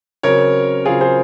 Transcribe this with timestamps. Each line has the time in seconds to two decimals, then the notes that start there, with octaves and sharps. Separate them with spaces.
0.23 C#3 F#3 C4 A#4 C#5
0.85 C#3 F#3 C4 F4 G#4
1.01 G#4 C5